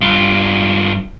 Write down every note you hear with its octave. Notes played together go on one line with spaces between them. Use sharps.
G2 F4